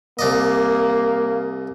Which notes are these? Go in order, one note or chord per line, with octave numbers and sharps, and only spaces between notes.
C2 A#3 D5 D#5